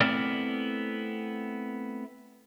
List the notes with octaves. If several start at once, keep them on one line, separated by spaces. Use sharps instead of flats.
A3 B3 C4 E4 A#4 D5